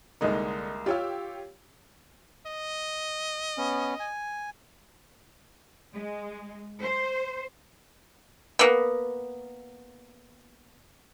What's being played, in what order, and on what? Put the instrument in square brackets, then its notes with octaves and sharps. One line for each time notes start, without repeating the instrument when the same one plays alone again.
[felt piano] C2 G#3 A#3 [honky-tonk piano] D3 D#4
[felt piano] F4 C#5 F5 [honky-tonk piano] G4 G5 E6
[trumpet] D#5
[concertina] B3 C#4
G#5
[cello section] G#3
C5
[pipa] A#3 B3